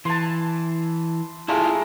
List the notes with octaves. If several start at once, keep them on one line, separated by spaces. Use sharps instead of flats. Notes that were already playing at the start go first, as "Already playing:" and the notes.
E3 A5 C6
G#3 A3 E4 F4 G4 A#4